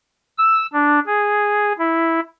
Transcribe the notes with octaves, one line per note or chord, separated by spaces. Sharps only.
E6
D4
G#4
E4